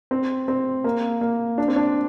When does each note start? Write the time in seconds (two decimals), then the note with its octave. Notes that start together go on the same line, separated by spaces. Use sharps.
0.11 C4
0.48 C4
0.84 A#3
1.21 A#3
1.58 D4
1.68 C4
1.76 D4